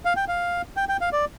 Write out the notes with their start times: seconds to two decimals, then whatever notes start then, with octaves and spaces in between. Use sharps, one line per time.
0.05 F5
0.16 G5
0.28 F5
0.77 G5
0.89 G5
1.01 F5
1.13 D5